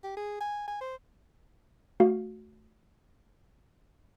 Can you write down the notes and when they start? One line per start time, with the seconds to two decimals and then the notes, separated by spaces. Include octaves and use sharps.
0.04 G4
0.17 G#4
0.41 G#5
0.68 G#5
0.81 C5
2.00 A3 F#4 F5